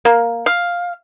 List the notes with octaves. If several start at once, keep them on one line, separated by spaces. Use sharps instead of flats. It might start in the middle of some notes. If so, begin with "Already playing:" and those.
A#3
F5